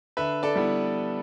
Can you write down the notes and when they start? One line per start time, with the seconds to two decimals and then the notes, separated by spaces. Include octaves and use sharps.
0.17 D3 B4 E5
0.43 A4 D5
0.56 G3 B3 E4